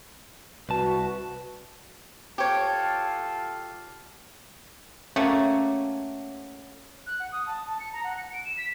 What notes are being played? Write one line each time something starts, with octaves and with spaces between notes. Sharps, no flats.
C2 F#4 B4 A5
F4 G4 A4 C#5 F5
A3 A#3 C#4 F#4
F#6
F#5
D#6
A5
A5
C#7
A#5
F#5
C#7
D7
E7
B6